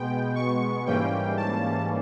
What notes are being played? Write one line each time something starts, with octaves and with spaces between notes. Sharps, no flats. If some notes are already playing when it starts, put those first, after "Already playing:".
Already playing: B2 G#3 B3 G5
C#6
G#2 E3 G3 A#3 C#4 G5
A5